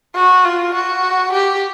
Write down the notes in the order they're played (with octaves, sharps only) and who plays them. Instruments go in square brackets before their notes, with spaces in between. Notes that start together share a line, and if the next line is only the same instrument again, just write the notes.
[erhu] F#4
F4
F#4
G4